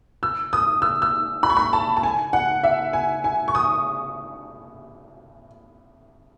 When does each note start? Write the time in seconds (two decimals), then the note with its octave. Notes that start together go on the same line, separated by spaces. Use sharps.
0.23 E6
0.53 D#6
0.82 E6
1.02 E6
1.43 B5
1.50 C#6
1.57 B5
1.73 A5
1.97 A5
2.03 G#5
2.33 F#5
2.63 E5
2.93 G#5
3.24 G#5
3.48 C#6
3.55 D#6